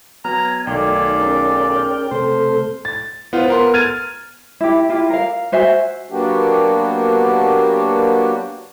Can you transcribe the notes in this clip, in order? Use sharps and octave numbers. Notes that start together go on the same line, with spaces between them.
F#3 B3 G#5 A#5 F6
B1 D#3 A3 D5 G5
C#4 G#4 A#4
F6
C3 A3 A4 C5
A6
B3 F4 C5
B3 A#4 C6
F6 G#6 A6 D#7
E4 G4
E4 F4 G4
A#4 F5
F#4 C5 E5 G#5
F#3 A#3 B3 D4 F#4 G4